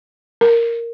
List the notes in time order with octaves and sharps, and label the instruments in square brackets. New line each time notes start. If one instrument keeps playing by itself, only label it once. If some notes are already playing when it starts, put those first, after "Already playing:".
[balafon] A#4